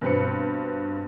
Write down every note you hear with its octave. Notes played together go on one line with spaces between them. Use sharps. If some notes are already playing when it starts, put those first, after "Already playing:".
G2 B2 C4 B4 B5 C#7